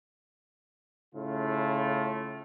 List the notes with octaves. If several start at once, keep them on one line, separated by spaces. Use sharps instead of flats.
A2 C#3 A3 F4